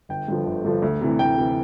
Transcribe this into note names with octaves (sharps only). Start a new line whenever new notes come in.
G1 G5
G2 D3 F3
G1
G2 D3 F3
D2
C3 E3
D2 G5
C3 E3